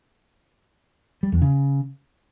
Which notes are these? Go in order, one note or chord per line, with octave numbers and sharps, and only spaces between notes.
G3
E2
C#3